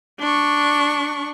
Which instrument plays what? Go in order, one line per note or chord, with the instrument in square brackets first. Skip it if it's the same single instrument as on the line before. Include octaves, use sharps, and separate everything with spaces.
[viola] D4 C#6